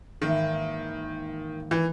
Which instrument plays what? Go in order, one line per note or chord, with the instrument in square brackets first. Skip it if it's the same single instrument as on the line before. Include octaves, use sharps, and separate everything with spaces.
[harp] G#1 E3 A#3 [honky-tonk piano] D#3
[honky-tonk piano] E3